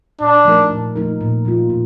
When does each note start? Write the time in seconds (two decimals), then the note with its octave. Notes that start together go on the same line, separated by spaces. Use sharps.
0.21 A#2 D4
0.45 F3 A3 D#4 A#4
0.70 A#2
0.96 F3 A3 D#4 A#4
1.21 A#2
1.45 F3 A#3 F4
1.70 A#2